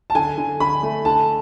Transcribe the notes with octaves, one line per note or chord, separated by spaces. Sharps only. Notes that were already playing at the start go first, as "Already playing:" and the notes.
A5
D3 G#5
D3
D3 B5
A3
D3 A5